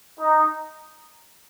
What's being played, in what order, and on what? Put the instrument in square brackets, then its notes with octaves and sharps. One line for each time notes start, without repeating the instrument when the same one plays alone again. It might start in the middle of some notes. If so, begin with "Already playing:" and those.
[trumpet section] D#4